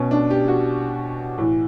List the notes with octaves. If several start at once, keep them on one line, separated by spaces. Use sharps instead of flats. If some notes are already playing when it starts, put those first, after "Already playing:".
Already playing: B2 C#4
D4
G4
F#4
A2 E3